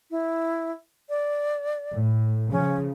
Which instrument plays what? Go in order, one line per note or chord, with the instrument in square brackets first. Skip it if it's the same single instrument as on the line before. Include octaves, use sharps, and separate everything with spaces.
[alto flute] E4
D5
[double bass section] A2
[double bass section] C#3 F3 [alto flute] C#4